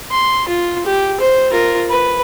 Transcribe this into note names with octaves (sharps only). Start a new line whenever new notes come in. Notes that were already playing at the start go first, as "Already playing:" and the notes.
C6
F4
G4
C5
F4 A#4
B4